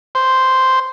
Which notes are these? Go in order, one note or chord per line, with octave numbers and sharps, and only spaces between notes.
C5